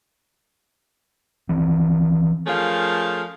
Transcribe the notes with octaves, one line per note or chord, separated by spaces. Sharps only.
D#3 E3 C4
F3 A3 C#4 G#4 A#4 F5